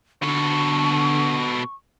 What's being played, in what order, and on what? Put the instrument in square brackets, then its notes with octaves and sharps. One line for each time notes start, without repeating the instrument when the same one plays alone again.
[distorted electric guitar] B2 A4 [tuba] D3 [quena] C#6